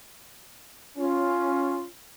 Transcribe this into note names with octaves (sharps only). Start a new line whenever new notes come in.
C#4 F4